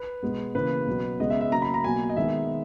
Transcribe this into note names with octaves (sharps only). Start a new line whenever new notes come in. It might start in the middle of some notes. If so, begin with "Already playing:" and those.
Already playing: B4
B2 G#3 B3
C#3 E3 A#3 B4
B2 F#3 B3
C#3 G#3 B3 D#5
E5
E5
C#3 F#3 A#3 A#5
B5
A#5
B2 F#3 A#3 G#5
D#5
D#3 G#3 B3 E5